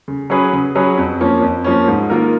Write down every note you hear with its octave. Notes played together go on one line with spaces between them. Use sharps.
C#3
F#3 C#4 G#4 B4
C#3
F#3 C#4 G#4 B4
F2
F3 A#3 C#4
F2
F3 A#3 C#4
G#2
D#3 A#3 F4 A#4